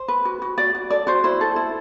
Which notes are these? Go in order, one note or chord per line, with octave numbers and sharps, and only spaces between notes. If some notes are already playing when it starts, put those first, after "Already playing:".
Already playing: C5
B4
F#4
F#4
F#4 D5
F#4
A4 D5
F#4 C5
E4 C5
A4
E4